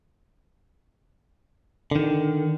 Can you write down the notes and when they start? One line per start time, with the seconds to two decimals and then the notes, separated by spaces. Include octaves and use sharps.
1.91 D3 D#3